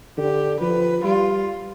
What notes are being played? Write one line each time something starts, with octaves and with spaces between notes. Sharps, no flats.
D3 G4
F3 B4
G3 F4